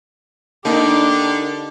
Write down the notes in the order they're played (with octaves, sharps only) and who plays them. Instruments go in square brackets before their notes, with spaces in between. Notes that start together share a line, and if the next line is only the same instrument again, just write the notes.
[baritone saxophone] D3 [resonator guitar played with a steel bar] A#3 D#4 A#4 [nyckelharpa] D4 G4